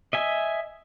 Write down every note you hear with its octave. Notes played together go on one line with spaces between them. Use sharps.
D#5 E5 G#5